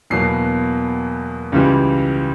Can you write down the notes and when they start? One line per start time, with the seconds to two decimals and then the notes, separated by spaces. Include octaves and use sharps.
0.10 E2 B2 F#3 A#3 C7
1.52 C#2 C#3 E3 G3